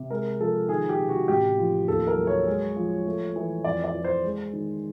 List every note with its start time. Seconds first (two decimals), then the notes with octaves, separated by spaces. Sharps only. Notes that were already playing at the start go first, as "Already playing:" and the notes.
Already playing: C3
0.10 G#3 A#4
0.40 F3 A4
0.69 D#3 G#4
0.89 G4
0.99 C3
1.09 F#4
1.28 A1 G4
1.58 F3
1.88 D#2 A4
2.07 A#4
2.18 F#3
2.27 C#5
2.47 G#3
2.76 F3
3.06 A3
3.36 E3
3.64 F2 D5
3.84 D5
3.95 E3
4.04 C5
4.24 G#3
4.53 D#3